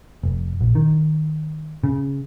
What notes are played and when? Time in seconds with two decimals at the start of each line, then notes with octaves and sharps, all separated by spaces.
0.23 F1
0.61 A#1
0.75 D#3
1.84 C#3